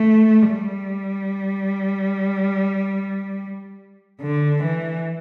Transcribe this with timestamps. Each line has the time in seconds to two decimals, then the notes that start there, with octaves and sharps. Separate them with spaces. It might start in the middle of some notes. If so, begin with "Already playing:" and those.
Already playing: A3
0.52 G3
4.21 D3
4.62 E3